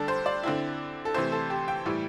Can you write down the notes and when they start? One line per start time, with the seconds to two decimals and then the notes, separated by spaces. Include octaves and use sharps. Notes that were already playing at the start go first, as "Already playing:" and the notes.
Already playing: D3 G3 D4 G4 A4
0.08 C5
0.26 D5
0.43 D3 C4 E4
1.05 A4
1.14 C3 E3 A3 C4 E4 C5
1.32 A4
1.50 G4
1.68 G5
1.85 A2 E3 G3 E4